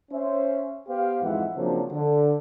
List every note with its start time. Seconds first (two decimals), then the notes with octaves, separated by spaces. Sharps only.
0.12 C#4 C5 E5
0.89 B3 G4 C5 F5
1.22 F2 G#2 E3 G#3 E5 F#5
1.56 C#3 F3 F#3 A#3 C4 D4
1.91 D3